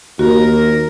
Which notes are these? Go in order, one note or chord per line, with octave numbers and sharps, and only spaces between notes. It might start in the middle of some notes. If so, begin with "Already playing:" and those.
D#2 F#4 A#4